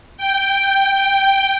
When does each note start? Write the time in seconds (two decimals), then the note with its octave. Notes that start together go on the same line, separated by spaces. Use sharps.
0.17 G5